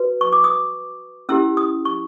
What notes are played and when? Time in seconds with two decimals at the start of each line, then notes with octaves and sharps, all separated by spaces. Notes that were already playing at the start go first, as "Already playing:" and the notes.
Already playing: F#4 B4
0.21 C#6
0.33 D6
0.44 D#6
1.29 C#4 E4 G4 E6
1.57 D#6
1.85 C#6